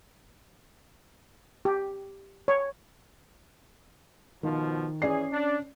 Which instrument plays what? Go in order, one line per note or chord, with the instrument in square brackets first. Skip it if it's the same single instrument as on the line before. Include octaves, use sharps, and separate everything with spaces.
[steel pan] G4
C#5
[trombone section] B2 F3 [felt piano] D#3
[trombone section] E3 G#4 [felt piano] C#4 D5 C7
[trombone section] D4